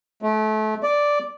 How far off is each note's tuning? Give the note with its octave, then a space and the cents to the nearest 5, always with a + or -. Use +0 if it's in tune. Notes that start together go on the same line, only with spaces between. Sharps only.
A3 -30
D5 -5